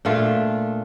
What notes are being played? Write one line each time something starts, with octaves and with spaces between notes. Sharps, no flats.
A#2 A3 D4 F4